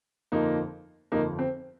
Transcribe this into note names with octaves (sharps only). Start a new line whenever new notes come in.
G1 F2 F3 A#3 D#4
G1 F2 F3 A#3 D#4
C4